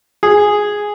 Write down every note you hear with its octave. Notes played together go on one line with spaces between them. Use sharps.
G#4